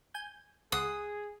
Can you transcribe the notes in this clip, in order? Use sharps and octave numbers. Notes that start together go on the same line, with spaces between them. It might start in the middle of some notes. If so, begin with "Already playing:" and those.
G#5 G6
C#2 G#4 F#5 C6 D#6